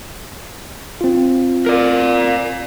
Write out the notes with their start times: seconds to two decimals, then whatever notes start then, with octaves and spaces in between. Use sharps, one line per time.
1.01 C4 F4
1.66 A#4 D5